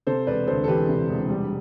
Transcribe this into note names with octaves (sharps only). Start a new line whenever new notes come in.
C3 A4 C5
E1 B4 D5
D2 A4 C5
A4
E3 G4 B4
C3
E1
G3